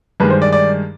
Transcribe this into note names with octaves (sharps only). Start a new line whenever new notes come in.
G2 D#3 G#3 B4
C5
D5
D5